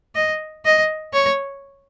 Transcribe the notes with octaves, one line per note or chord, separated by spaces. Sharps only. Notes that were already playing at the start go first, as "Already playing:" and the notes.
D#5
D#5
C#5